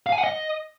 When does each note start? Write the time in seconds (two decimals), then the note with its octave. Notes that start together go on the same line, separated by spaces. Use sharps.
0.07 F5
0.12 G#5
0.18 F#5
0.24 D#5